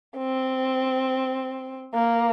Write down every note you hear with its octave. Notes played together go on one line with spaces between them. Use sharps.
C4
A#3